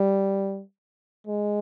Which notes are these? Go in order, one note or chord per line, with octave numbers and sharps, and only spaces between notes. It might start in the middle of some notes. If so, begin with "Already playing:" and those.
Already playing: G3
G#3